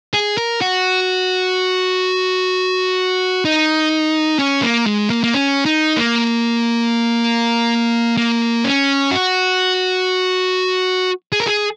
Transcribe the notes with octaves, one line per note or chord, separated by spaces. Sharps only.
G#4
A#4
F#4
D#4
C#4
A#3
G#3
A#3
A#3
C#4
D#4
A#3
A#3
C#4
F#4
G#4
A#4
G#4